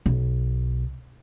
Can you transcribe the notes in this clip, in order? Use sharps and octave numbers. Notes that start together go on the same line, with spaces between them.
B1